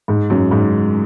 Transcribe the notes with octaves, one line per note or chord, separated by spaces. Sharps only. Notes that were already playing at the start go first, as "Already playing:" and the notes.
G#2
F#2
G#2